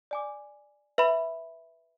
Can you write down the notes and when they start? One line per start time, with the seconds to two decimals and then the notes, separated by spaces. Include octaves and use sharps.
0.11 D5 G#5 D6
0.98 B4 E5 B5